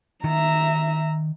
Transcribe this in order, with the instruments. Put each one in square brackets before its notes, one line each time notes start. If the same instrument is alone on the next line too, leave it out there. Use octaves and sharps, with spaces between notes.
[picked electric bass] D#3 [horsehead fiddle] E5 A#5